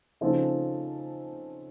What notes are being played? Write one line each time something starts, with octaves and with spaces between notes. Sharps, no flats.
C#3 F3 C4 D#4 A4